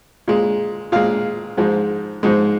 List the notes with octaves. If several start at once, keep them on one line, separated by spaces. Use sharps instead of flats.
A#2 G#3
A#2 G#3 F5
G#2 F3 G#3
G#2 F3 G#3